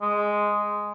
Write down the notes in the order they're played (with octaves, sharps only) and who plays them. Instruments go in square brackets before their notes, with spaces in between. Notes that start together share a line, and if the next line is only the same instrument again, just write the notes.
[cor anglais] G#3